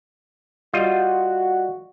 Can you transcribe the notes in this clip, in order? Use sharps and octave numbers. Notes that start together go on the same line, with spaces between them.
G3 F4 F#4 D#5